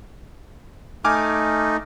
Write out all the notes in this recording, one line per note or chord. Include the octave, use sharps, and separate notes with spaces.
A3 D#4 G#5 D6 F6